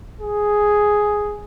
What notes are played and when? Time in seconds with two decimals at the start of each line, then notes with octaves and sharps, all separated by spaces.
0.21 G#4